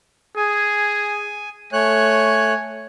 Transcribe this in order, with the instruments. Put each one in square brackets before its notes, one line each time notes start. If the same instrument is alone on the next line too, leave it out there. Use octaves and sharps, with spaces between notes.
[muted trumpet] G#4 [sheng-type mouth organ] G#5
[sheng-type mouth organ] A3 C#5 F#6 [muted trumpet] G#5